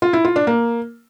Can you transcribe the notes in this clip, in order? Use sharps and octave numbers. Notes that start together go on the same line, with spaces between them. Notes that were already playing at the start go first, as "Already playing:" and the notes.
F4
E4
F4
D4
A#3